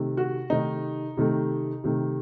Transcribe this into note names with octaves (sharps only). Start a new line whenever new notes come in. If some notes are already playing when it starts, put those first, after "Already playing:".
Already playing: C3 D#3 A3
F#4
C3 D#3 A3 D#4
C3 D#3 A3
C3 D#3 A3